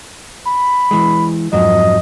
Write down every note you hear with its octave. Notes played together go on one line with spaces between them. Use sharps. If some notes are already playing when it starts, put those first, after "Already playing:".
B5
E3 G#3
F2 G#2 F#3 D#5